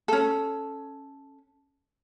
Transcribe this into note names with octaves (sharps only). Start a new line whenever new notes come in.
C#4 A4